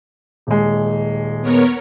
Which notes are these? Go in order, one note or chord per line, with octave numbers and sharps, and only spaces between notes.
D#1 G#3
B3 A#4 C#5